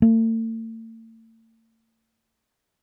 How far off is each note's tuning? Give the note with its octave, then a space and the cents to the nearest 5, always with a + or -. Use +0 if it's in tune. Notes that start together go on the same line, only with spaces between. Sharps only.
A3 +45